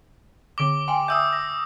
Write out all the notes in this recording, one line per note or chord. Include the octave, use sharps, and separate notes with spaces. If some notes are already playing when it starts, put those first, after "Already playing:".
D3 D6 D7 G7
G5 G#5 C6
E5 D#6 E6 G6
A#6